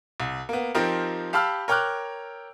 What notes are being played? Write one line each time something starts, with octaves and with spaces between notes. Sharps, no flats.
C2
A#3 B3
F3 C4 D#4 G4 A#4
G4 F5 A5 B5 E6 F6
A#4 C#5 G5 D6 F6 F#6